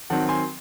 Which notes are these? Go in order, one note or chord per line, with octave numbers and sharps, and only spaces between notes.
D#3 F#3 C4 F#5 A5
G#5 C6